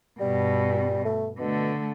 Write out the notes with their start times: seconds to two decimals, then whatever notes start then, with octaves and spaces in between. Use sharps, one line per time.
0.20 G2 B2 G3
1.05 A3
1.39 B2 D3 A3